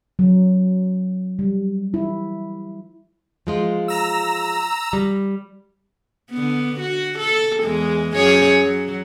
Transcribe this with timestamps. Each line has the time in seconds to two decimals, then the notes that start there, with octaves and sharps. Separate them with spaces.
0.19 F#3
1.39 G3
1.94 E4
3.47 F3 G#3 F4
3.88 A#5 E6
4.93 G3
6.31 D3 B3
6.80 F#4
7.19 A4
7.62 E2 G#3
8.16 F#2 G#4 C#5
8.63 F#3